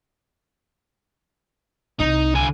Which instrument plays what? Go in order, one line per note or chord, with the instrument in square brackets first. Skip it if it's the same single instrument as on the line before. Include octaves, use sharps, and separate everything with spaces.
[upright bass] C2 [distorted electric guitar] D#4
[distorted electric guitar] D3 G#5